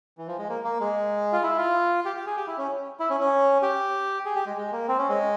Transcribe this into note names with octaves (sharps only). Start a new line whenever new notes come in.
E3
F3
G#3
A#3
A#3
G#3
F4
E4
F4
G4
G4
G#4
G4
E4
C#4
E4
C#4
C#4
G4
G#4
G4
G#3
G#3
A#3
C4
C#4
G#3